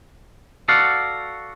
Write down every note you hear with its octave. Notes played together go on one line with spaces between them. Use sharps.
F#4 A4 D5 F5 F#5